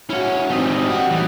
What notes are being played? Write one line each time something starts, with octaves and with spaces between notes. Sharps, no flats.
C#4 E4 F#4
G3 C4 D#4 D#5
F#4
A2 E3 G3